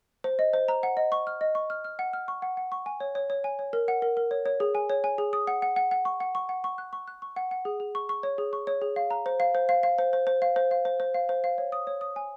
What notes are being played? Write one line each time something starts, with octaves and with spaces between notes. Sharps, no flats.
C5
D#5
C5
A#5
F#5
D#5
C#6
F6
D#5
C#6
F6
F6
F#5
F6
C#6
F#5
F#5
C#6
G#5
C#5
C#5
C#5
G#5
C#5
A#4
F#5
A#4
A#4
C#5
C#5
G#4
G#5
C#5
G#5
G#4
D#6
F#5
F#5
F#5
F#5
C#6
F#5
C#6
F#5
C#6
F#6
C#6
F#6
C#6
F#5
F#5
G#4
G#4
C#6
C#6
C#5
G#4
C#6
C#5
G#4
F5
A#5
C5
F5
C5
F5
F5
C5
C5
C5
F5
C5
F5
C5
C5
F5
C5
F5
C#5
D#6
C#5
D#6
G#5